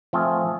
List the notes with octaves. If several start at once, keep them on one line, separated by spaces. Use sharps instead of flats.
F3 A3 C4 F4 G#4